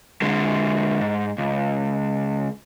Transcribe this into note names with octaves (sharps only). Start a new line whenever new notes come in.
D3 G#3
G#2
C#2